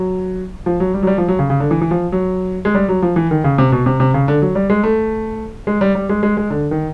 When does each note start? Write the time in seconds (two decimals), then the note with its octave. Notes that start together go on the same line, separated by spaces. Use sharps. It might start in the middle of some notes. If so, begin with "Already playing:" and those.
Already playing: F#3
0.66 F3
0.80 F#3
0.94 G3
1.03 F#3
1.07 G3
1.18 F3
1.28 F#3
1.39 C#3
1.50 C#3
1.60 D3
1.71 E3
1.81 E3
1.91 F3
2.12 F#3
2.65 G#3
2.75 G3
2.89 F#3
3.02 F3
3.16 E3
3.31 D#3
3.44 C#3
3.58 C3
3.72 B2
3.86 C3
4.00 C3
4.14 C#3
4.28 D3
4.42 F#3
4.55 G3
4.70 G#3
4.84 A3
5.67 G#3
5.81 G3
5.95 G3
6.09 G#3
6.23 G#3
6.37 G#3
6.50 D3
6.71 D#3